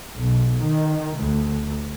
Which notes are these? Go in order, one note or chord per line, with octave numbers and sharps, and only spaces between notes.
B1
D#3
D2